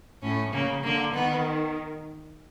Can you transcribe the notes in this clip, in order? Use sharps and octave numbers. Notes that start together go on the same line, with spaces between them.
A2 C#4
C#3 A#3
D3 A#3
D#3 B3